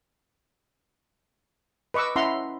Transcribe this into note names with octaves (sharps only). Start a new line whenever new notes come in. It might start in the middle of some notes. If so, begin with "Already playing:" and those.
B4 D#5 C#6 D6 E6
C#4 E4 E5 F#5 A#5 C6